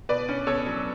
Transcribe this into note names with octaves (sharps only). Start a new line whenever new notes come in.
B2 B4 D5
C#4
B2 A4 C#5
F#3